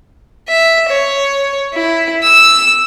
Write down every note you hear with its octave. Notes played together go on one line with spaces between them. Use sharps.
E5
C#5
E4
E6